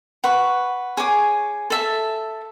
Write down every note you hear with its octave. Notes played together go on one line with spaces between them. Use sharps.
B4 F#5 C#6
G#4 C#5 G#5 D6
A4 E5 A5